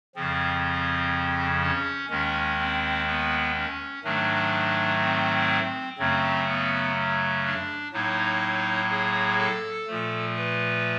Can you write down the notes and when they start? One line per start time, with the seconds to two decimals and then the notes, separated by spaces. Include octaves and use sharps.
0.16 F2 C#3 F3 C4
1.62 C#4
2.10 D#2 D#3 G#3 C#4
2.59 C4
3.07 B3
3.56 C#4
4.04 G#2 D#3 F#3 A3 D4
5.02 C4
5.99 F#2 C#3 F#3 A3 C4
6.47 B3
7.44 D4
7.92 A2 F#3 A#3 D#4
8.90 G#4
9.38 A4
9.87 A#2 F3 A3
10.36 B4